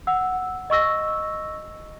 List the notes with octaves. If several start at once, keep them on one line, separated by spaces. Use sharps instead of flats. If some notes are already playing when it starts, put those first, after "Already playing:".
F#5 E6
D#5 C#6 E6 A#6